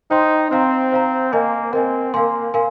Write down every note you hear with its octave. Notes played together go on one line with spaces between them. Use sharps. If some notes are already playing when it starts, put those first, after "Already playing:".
D#4 C5 G5 C6
C4 C5 F5 A#5
C5 F5 A#5
A#3 A#4 D#5 G#5
C4 A#4 D#5 G#5
A#3 A#4 F5 G#5 C6
A#4 F5 G#5 C6